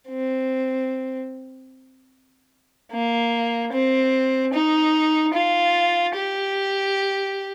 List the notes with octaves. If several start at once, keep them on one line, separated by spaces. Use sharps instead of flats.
C4
A#3
C4
D#4
F4
G4